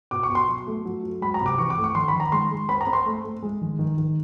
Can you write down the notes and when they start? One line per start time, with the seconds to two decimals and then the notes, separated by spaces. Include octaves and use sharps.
0.11 B2 D6
0.23 C#6
0.30 B2
0.35 C6
0.48 F#3
0.67 A3
0.85 F#3
1.03 F#3
1.22 G#3 B5
1.34 A#5
1.41 C3
1.46 D6
1.58 E3 C#6
1.70 D6
1.77 A3
1.84 C#6
1.95 D#3 C6
2.08 B5
2.14 D#3
2.20 A#5
2.32 G#3 C6
2.51 G#3
2.69 C4 B5
2.81 A#5
2.87 C4
2.93 C6
3.06 A3
3.24 A3
3.43 G#3
3.61 D#3
3.79 D#3
3.98 D#3